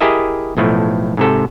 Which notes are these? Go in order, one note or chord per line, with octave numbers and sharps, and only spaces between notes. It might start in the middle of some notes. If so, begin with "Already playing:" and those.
E4 G4 G#4 A#4 D#5 E5
B1 A2 F3 A3
G#2 C3 A4